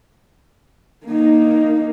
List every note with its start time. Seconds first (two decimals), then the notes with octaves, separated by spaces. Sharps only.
1.06 A#3 D#4